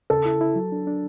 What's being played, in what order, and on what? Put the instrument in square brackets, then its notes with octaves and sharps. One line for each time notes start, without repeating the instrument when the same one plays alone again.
[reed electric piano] C#3 [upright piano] A4
[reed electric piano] E4
E4
F#3
D4
D4